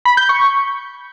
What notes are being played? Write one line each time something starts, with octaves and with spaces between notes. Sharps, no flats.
B5
G6
C#6